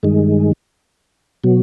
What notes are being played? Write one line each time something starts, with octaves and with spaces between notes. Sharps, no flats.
G2 D#3 G#3
B2 F#3